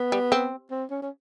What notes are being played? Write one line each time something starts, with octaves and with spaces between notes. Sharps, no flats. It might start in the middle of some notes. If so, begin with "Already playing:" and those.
Already playing: B3
G3
C4
C4
C#4
C#4